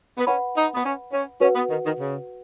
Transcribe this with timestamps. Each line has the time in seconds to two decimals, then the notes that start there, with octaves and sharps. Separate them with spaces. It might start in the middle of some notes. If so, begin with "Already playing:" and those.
0.18 B3
0.27 C#4 B4 F#5 B5
0.55 D#4
0.75 B3
0.84 C#4
1.13 C#4
1.40 C#4 F#4 B4 F#5
1.55 B3
1.70 D#3
1.84 D#3
1.98 C#3